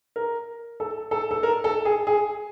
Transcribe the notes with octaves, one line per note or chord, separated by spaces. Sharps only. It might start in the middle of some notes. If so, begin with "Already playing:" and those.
A#4
A4
A4
A4
A#4
A4
G#4
G#4